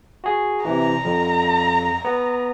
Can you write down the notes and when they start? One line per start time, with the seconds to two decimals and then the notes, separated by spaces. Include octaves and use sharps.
0.24 F#4 G#4
0.65 C3 E3 A#5
1.05 F2
2.05 B3